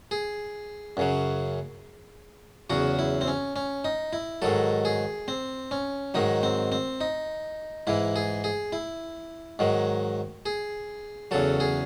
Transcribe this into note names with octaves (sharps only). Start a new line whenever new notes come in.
G#4
F#2 C#3 F#3
E2 C#3 F#3 F#4
E4
C4
C#4
C#4
D#4
E4
G#2 D#3 F#3 A4
G#4
C4
C#4
G#2 D#3 F#3 D#4
C4
C4
D#4
G#2 E3 E4
G#4
G#4
E4
G#2 D#3 F#3
G#4
E2 C#3 F#3 A4
G#4